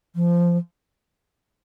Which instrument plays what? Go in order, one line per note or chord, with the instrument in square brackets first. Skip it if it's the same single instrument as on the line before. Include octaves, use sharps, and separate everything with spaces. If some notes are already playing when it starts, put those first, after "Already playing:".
[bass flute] F3